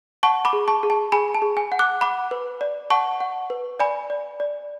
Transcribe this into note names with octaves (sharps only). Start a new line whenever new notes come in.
F#5 A5 C#6
B5 D6
G#4
A5 C#6
G#4
A5
G#4 G#5 B5
A5
G#4
G#5
F#5
D6 F#6
F#5 B5 D6
B4
D5
F#5 A5 C#6
F#5
B4
D5 G#5 B5
D5
D5